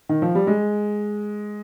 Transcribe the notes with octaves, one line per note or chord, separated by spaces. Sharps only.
D#3
F3
G3
G#3